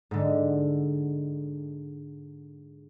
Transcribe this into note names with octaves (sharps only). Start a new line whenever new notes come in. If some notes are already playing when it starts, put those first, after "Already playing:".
G#2 D3